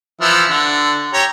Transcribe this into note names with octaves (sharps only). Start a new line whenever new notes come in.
E3 F3 E5
D3
G4 C#5 A#5